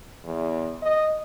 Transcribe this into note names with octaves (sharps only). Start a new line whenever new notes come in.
E2
D#5